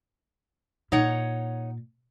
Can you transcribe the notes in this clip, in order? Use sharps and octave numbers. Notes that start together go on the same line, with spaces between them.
A#2 D#4 C#5 F#5